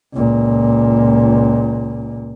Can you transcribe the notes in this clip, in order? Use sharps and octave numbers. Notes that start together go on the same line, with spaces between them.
C#2 A#2